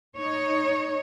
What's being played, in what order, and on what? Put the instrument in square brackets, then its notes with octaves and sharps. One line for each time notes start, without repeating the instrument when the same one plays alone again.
[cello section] D#4 C#5